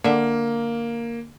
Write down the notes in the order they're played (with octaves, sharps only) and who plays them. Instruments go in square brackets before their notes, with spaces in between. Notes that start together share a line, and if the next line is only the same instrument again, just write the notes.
[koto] D3 E5 [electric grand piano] A#3